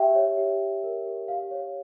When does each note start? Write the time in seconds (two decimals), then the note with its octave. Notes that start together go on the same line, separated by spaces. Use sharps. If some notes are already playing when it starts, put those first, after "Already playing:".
Already playing: G4 E5 G5
0.15 C#5
0.37 G4
0.60 G4
0.83 A#4
1.05 G4
1.28 G4 F5
1.51 C#5